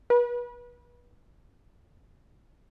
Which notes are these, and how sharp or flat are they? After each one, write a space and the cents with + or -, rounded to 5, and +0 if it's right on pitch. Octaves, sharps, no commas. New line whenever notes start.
B4 -35